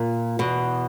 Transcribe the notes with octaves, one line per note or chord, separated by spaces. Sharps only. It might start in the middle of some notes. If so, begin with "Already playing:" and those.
Already playing: A#2
E2 B2